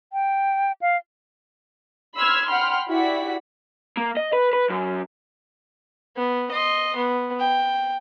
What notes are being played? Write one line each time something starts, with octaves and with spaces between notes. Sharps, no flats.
G5
F5
B5 C6 E6 F6 G#6
F#5 G5 B5 C6 F6
E4 F#4 G4 D5 F#5 B6
A#3
D#5
B4
B4
F#2
B3
D#5 C6
B3
G5